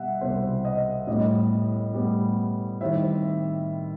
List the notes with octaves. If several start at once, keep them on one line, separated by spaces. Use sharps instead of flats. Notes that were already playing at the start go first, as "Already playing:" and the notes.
Already playing: B2 G3 E5 F#5
C2 B2 G3 C5
D#5
A2 G3 B3 D#5
A2 G3 B3
D#3 G3 C4 E4 E5